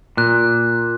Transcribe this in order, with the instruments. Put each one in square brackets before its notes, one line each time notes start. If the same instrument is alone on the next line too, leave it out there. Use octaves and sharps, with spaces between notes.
[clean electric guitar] A#2 [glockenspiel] F#6